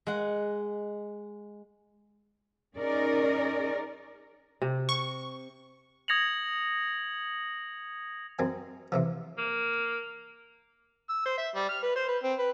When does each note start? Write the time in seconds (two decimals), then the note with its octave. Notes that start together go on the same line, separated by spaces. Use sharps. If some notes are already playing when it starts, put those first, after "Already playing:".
0.07 G#3 F#5
2.77 C#4 D#4 G#4 A#4 D5
4.62 C3
4.89 C#6
6.08 D#6 G#6 A#6 C#7 F7 F#7
8.39 F#2 C4 G#5
8.92 C3 E3 F3
9.38 A#3
11.09 E6
11.25 C5
11.38 E5
11.55 G3
11.69 F6
11.83 B4
11.96 C5
12.08 B4
12.23 C4
12.39 B4